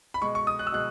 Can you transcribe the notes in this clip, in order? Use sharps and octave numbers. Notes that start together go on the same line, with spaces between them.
B5
B2 G#3 C#6
C#6
D#6
F#6
E6
B2 G#3 F#6